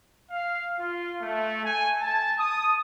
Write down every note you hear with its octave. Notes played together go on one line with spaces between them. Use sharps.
F5
F4
A3
G#5
A5
D#6